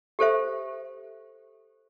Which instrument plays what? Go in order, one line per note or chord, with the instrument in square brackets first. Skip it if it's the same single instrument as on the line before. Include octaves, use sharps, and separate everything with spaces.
[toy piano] G4 A4 C5 E5